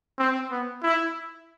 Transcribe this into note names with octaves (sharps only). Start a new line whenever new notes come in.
C4
B3
E4